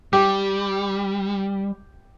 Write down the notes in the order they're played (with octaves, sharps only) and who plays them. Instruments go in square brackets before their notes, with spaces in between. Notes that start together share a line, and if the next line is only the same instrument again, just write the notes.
[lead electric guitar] G3 [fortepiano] G4